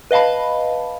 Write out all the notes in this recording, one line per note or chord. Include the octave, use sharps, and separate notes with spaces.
B4 D#5 F5 A5 B5